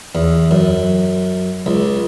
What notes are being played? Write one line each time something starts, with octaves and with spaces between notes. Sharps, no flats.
E2
F#2
C#2